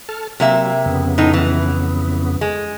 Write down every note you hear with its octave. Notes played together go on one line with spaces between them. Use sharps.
A4 A5 F6
C3 F#3 A#3 E5
F2 C#3 B3
A2 D#4
E3
G#3